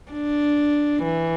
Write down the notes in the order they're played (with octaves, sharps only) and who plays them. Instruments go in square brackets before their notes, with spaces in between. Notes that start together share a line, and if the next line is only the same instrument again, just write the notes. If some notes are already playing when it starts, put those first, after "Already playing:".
[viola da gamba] D4
E3